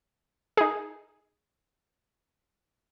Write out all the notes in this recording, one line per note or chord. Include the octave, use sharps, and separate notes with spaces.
D#4 G#4